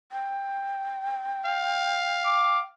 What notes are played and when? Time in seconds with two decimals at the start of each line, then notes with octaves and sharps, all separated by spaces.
0.12 G5
1.46 F5
2.25 D6